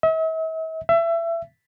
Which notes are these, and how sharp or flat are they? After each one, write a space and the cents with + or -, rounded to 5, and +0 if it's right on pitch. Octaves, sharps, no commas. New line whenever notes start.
E5 -45
E5 +25